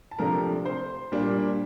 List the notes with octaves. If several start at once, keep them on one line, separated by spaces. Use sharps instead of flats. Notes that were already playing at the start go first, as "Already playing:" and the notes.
A5
C3 F3 A3 D4 A#4 A#5
C5 C6
A#2 G3 A#3 D4